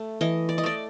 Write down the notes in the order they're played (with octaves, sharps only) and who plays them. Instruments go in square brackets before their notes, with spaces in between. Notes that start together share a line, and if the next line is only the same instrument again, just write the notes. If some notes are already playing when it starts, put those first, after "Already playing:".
Already playing: [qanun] A3
E3 D#5
D5
D#5
A3 D5